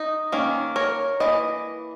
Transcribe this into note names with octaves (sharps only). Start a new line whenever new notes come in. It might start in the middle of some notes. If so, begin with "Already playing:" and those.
Already playing: D#4
D#3 A#3 C#4
A#4 C#5
E3 A#3 D#5